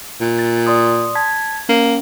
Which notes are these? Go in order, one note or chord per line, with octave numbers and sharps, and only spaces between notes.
A#2
A6
D5 C6 D#6
A5 G#6 B6
A#3 C#4